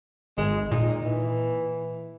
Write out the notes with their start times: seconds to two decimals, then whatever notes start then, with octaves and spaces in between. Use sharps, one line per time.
0.38 G#1 G#3
0.72 A#2 D#4
1.04 E3